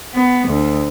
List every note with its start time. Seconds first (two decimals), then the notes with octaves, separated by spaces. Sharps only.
0.14 B3
0.48 D2